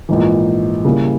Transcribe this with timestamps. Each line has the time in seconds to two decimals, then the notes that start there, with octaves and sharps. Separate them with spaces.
0.09 A#1 G#2 E3
0.85 C#3 G3 A#3 E4